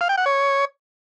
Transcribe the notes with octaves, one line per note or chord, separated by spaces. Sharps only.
F5
G5
F#5
C#5